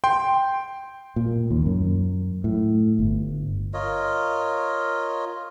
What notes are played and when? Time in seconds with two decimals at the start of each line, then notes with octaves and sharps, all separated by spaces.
0.04 G5 C6
1.16 A#2
1.51 D#2
1.66 F#2
2.44 A2
2.99 G1
3.74 F4 A#4 C#5 D#5